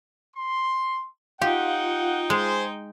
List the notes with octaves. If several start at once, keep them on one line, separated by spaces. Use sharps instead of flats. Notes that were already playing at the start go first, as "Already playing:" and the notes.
C6
D#4 F4 G4 F#5 G5
G#3 G#4 C5